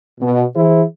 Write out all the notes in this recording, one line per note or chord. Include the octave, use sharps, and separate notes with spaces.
B2
E3 E4 G#4 C5